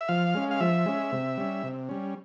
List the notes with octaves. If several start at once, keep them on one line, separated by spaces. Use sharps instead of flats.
E5
F3 F5
G#3 C#4
F5
F3 E5
G#3 C#4
C3
G3 C#4
C3
G3 C#4